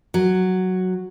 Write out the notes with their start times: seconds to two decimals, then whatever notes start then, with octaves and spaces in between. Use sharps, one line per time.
0.14 F#3